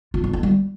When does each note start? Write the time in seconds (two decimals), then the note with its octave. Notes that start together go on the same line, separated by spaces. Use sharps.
0.14 F4
0.24 F#3
0.33 F4
0.43 G3